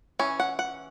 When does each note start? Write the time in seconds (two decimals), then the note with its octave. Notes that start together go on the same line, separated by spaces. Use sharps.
0.19 E3 C#4
0.40 F#5
0.59 F#5